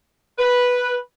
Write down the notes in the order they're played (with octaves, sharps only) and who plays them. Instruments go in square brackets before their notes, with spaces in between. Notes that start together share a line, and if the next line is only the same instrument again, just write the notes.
[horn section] B4